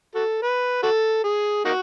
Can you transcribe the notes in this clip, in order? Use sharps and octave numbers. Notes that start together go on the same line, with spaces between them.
F#4 A4
B4
F#4 A4
G#4
A#3 D#4 F#4